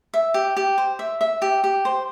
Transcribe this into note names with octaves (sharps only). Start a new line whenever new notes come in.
E5
G4
G4
C5
E5
E5
G4
G4
C5